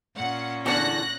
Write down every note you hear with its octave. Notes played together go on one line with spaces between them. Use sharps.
A#2 C#4 F#5
E2 D3 F#4 F#6 A#6